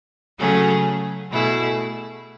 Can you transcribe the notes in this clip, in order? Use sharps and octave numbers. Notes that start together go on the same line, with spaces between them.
C#3 F#3 A3 C#4 G#4
B2 A3 E4 G#4